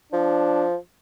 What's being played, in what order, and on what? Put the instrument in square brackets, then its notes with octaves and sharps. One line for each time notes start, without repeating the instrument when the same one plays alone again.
[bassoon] F3 [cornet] D4